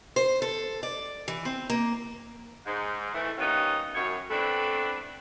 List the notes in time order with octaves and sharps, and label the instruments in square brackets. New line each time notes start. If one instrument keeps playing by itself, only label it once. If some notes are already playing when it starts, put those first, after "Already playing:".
[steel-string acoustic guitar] C5
A4
D5
E3
C4
A#3
[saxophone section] G#2
E3 A3
D#3 G3 A#3 B3 C#4 D#4
F#2 C#5
E3 A3 B3 C4 D4 B4